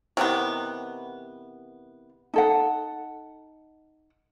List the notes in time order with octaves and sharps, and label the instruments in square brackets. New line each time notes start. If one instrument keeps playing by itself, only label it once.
[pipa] C3 D#3 E3 B3
[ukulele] D#4 A4 F#5